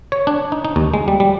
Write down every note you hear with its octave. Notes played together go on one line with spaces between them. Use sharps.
C#5
D4
D#4
D#4
D#2
G#3
G3
G3